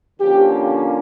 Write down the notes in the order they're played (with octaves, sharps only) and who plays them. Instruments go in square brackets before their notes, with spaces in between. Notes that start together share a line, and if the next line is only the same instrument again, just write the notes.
[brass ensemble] D3 F3 A#3 C#4 G4